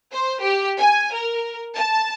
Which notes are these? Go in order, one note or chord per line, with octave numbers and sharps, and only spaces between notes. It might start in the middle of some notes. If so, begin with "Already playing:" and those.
C5
G4
G#5
A#4
A5